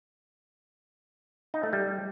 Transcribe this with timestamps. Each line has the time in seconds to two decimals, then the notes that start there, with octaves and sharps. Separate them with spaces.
1.54 D#4
1.63 A3
1.73 G3